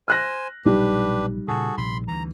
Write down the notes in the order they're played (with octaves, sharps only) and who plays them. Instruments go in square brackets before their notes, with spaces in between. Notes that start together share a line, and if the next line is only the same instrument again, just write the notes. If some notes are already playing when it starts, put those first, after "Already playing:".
[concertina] C5 G#5 [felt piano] F6 F#6 A#6
[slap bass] A#1 B2 F#3 [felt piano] G3 D#4 [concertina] D4 G4 B4
[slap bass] A#2 C#3 [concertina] F#4 G#4 A4
[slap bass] A#1 C3 [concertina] B5 C6
[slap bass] D2 E3 [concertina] A#5